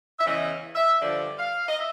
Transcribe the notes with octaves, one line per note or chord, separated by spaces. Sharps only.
E5
E2 C#3 E3 D#5
E5
G2 D3 F3 D5
F5
D#5
E5